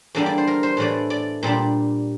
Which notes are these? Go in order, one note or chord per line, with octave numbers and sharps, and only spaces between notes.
E2 D3 G3 A#3 D4
D5
C5
A#4
C5
A2 E3 A3 D4 D5
D5
A#2 G3 D4